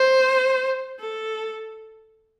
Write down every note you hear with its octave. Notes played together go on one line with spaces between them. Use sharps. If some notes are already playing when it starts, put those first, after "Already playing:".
Already playing: C5
A4